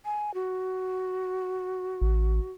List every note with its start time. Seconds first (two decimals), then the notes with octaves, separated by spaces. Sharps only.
0.05 G#5
0.34 F#4
2.02 A1